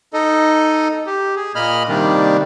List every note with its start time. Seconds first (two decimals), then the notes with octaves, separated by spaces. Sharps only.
0.13 D#4 A4 D#5
1.07 G4
1.36 G#4
1.55 A#2 A#3 D#5 B5 F6
1.89 C3 D#3 G3 A#3 D4